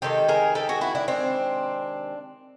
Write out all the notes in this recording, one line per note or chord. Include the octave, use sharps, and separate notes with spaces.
C3 D#3 G#3 G4 A4
G#4 A#4
G4 A4
F#4 G#4
E4 F#4
D4 E4
C4 D4